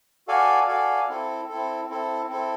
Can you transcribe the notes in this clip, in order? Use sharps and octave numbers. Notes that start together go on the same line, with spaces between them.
F#4 A4 D5 F5 G#5
F#4 A4 D5 F5 G#5
C4 E4 A4
C4 E4 A4
C4 E4 A4
C4 E4 A4